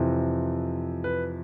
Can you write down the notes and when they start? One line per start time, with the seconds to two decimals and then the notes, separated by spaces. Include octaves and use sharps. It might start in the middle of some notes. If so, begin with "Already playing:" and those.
Already playing: F2 C3 E3
1.04 B4